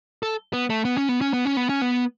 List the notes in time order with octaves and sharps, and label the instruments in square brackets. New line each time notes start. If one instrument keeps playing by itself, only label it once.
[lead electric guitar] A4
B3
A3
B3
C#4
B3
C#4
B3
C#4
B3
C#4
B3